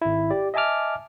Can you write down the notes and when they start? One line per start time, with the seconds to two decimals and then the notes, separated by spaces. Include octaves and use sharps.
0.02 G#1 E4
0.31 G4 D5
0.54 D#5 E5 G#5 A5 D6 F6